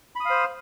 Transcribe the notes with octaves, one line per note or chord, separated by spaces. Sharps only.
C5 F5 B5 D#6